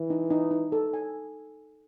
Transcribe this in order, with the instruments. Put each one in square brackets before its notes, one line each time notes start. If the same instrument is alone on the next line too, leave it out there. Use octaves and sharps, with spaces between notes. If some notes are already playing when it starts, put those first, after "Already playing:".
Already playing: [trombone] E3
[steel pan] D#4
D#4
D#4
A4
G#5